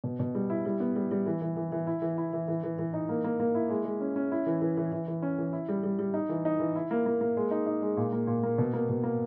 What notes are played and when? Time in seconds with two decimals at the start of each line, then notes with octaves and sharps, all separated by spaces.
0.04 B2
0.19 B2
0.35 G3
0.50 E4
0.65 G3
0.80 B3
0.96 G3
1.11 G3
1.26 E3
1.41 E3
1.57 E3
1.72 E3
1.87 E4
2.02 E3
2.18 E4
2.33 E3
2.48 E3
2.63 E3
2.79 E3
2.94 D#4
3.09 A#3
3.24 A#3
3.40 A#3
3.55 E4
3.70 G#3
3.85 G#3
4.01 C#4
4.16 C#4
4.32 E4
4.46 E3
4.62 E3
4.77 E3
4.92 E3
5.07 E3
5.22 C#4
5.38 E3
5.53 E4
5.69 G3
5.83 G3
5.99 G3
6.14 D#4
6.29 E3
6.45 D#4
6.59 E3
6.75 E4
6.91 A#3
7.06 A#3
7.21 A#3
7.37 G#3
7.51 D#4
7.67 D#4
7.82 G#3
7.97 A#2
8.13 A#3
8.27 A#2
8.43 A#3
8.58 B2
8.73 A#3
8.89 B2
9.04 A#3